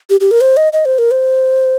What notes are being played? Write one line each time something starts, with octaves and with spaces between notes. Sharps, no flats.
G4
G4
A#4
C5
D#5
D#5
C5
A#4
C5